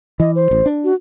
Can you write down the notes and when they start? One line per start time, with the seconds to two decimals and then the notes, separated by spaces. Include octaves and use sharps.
0.20 E3 D#5
0.35 C5
0.51 A1
0.66 D4
0.84 F#4